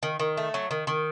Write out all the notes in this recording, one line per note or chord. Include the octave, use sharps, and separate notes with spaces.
D#3
D#3
A3
F#3
D#3
D#3